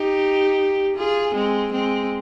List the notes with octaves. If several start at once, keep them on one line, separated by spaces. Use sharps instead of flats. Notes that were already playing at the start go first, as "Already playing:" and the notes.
Already playing: D#4 G4
F4 G#4
G#3 C4
G#3 C4